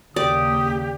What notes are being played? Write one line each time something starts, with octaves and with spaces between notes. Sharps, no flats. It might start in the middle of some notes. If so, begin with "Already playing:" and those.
D#2 C#3 A#3 G4 D5 D#6